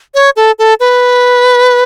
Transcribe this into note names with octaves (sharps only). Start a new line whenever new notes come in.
C#5
A4
A4
B4